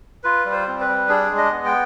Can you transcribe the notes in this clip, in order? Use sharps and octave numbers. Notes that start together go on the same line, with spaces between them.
F4 B4
G3
C5
C4
B4
G3
D4 G#4
G#3
D#5
B3
G5